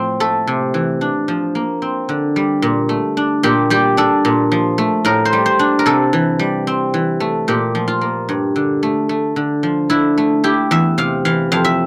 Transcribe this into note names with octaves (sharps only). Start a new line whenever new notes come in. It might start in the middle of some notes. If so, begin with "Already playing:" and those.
Already playing: A2 F3 C4
A3 A4
C3
E3
D4
F3
A#3
C4
D3
G3
A#2
A3
D4
A#2 G4
G3 G4
D4 A4
A#2
F3
A3
A2 A#4
C5
G3
C5
D4
A#4
C3 A4
E3
G3
C4
E3
A3
A#2 G4
F3
F4
A#3
G2
D3
A3
A3
D3
F3
D3 E4
A3
E4 G4
E2 E5
C3 F5
E3 F5
F2 F5
E5